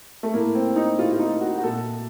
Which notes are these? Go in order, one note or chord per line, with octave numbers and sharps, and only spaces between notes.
A3
A2 A#3
C4
D#4
A2 F4
F4
D#4
F#4
F#4
A#2 A4